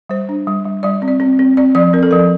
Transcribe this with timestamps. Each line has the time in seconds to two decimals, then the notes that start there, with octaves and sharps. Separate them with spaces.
0.10 G3 C5
0.29 D4
0.47 G3
0.65 G3
0.83 G3 D5
1.02 C4
1.08 D5
1.20 C4
1.39 C4
1.57 C4 D5
1.75 F3 D5
1.93 C4 A#4
2.03 A4
2.11 F3 A#4